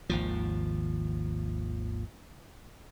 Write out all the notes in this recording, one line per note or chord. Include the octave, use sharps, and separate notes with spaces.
G#1 D#2 F3